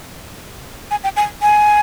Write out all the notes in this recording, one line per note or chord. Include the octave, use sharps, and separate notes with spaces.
G#5
G5
G#5
G#5